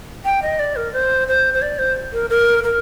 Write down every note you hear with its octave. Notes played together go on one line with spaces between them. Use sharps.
G5
D#5
D5
A#4
C5
C5
C5
D5
C5
A#4
A#4
A#4